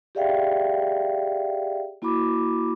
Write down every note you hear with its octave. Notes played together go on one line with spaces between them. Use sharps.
G4 G#4 D5 E5 F5 G5
A#3 E4 F#4 B5 D6